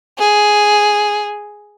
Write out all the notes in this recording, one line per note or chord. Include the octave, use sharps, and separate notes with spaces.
G#4